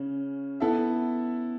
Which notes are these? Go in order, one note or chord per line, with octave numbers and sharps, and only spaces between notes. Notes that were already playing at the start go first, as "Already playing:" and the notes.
Already playing: C#3 C#4
B3 E4 A4 E5